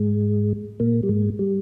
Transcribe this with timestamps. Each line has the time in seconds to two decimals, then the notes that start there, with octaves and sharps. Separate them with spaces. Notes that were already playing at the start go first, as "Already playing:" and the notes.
Already playing: G#2 G#3
0.80 A#2 A#3
1.03 G3
1.09 G#2 G#3
1.39 G3